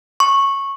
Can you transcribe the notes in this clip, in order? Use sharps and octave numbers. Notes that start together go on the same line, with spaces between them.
C#6